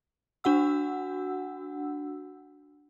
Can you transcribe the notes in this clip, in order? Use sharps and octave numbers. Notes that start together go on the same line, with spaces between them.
D4 F#4 F#5 E6